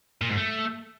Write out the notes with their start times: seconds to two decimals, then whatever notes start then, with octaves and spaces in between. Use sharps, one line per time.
0.22 A#2
0.30 G#2
0.38 A3